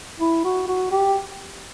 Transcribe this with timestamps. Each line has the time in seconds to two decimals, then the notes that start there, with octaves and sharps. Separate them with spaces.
0.20 E4
0.44 F#4
0.68 F#4
0.91 G4